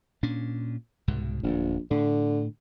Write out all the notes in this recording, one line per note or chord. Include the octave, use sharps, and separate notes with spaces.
A#2 C#4 D4
C2 G#2 B2
D1 A#1
A2 D3